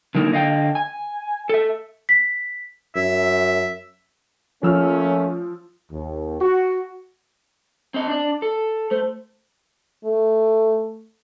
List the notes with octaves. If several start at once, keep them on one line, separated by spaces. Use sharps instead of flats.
D3 F#3 A#3 D#4 E4
D3 D#5 F5 G5
G#5
A4 E5
B6
F#2 E5
F3 A3 A#3 C#4 E6 F6
D#2
F#4
C4 D#5
D4 D5
A4
A3 C5
A3